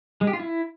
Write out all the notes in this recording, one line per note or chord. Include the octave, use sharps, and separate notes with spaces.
G#3
G4
F4
E4